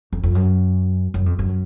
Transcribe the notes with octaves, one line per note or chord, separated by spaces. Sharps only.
F2
F2
F#2
F#2
F2
F#2